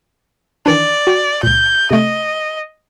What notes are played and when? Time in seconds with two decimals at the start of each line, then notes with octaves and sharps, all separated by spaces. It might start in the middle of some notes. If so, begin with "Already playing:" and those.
0.66 D#3 E3 D4 D5
1.07 F#4 G5
1.43 C#2 A#2 G6
1.91 C3 A3 D#5